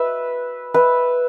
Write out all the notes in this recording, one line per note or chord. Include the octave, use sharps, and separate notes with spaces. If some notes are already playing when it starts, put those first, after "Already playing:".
Already playing: B4 E5
B4 E5